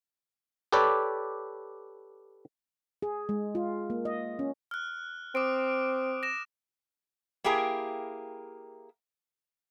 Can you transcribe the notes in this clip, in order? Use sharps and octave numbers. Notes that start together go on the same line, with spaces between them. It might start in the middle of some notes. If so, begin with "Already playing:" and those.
G4 A4 B4 C#5 D5
G#4
G#3
F4
A#3
D#5
C#4
F6 F#6
C4 D6 D#6 D7
A#6 E7
A#3 E4 G4 G#4 A#4